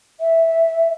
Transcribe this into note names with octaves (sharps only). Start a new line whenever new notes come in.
E5